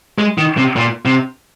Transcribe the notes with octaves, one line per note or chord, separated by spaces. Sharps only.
G#3
D#3
C3
A#2
C3